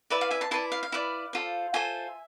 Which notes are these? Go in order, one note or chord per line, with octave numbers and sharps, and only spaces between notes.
E4 B4 D5 E5
F5
E5 G#5
A5 C6
E4 B4 D5 A5 C6
F5
F5
E4 B4 D5
F4 A4 C5
F4 A4 C5 E5 G#5